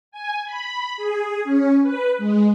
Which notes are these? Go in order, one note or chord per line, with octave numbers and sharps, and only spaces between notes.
G#5
B5
G#4
C#4
B4
G#3